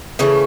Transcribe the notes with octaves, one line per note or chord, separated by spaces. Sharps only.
C#3 E3 A3 C#4